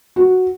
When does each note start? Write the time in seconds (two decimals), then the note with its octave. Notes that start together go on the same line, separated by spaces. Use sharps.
0.16 F#4